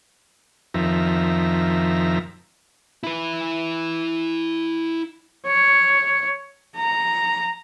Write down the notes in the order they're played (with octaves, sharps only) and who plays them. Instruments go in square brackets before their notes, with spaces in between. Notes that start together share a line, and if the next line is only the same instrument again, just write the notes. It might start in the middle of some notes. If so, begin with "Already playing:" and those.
[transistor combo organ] F2 D#3 F3 E5 A#5
[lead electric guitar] E4 B4
[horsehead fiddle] C#5
A#5